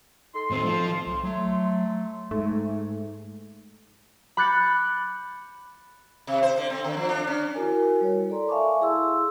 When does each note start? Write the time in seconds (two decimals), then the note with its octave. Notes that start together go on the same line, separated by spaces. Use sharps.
0.35 D#4 A4 C6
0.51 A2 C4
0.65 F3
1.07 B1 C6
1.24 F#3 A3 C6
2.31 G#2 A3
4.37 B5 D6 F#6 G6 A6 C#7
6.27 C3
6.43 C5
6.58 D3
6.70 C4
6.84 D3
6.97 F3
7.09 D4
7.27 C#4
7.54 E4 F#4 A#4 G#5
8.01 G3 C#5
8.30 A4 D5 A#5 C6
8.48 E5 F5 G#5 A5 C#6 D6
8.81 E4 G#4 C6 E6